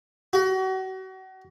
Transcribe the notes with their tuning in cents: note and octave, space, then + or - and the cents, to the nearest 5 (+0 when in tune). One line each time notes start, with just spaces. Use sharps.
F#4 +35